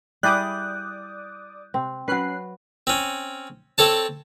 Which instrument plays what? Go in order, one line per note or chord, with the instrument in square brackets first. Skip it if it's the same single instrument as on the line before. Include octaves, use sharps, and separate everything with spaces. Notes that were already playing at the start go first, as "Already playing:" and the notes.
[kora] G3 E4 G#4 [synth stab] D5 D6 D#6 [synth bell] F#6 G6
[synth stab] C3 [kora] C4
[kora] F#3 B4 [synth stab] C#4 F#6 C7
[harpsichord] C4 C#4
C4 A4 C#5 A5